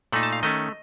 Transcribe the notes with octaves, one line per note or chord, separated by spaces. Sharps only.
A#2 A3 D#4 F#5
A5
F5
D#3 A3 C#4 D#5